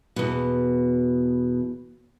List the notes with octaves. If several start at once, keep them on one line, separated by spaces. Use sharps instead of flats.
E2 B2